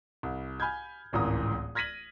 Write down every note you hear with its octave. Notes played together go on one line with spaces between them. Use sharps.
C2
G#5 B5 F6 G6 G#6
D1 G#1 C#2 E3 A#4 D#6
F6 G#6 A#6 B6 D#7 F#7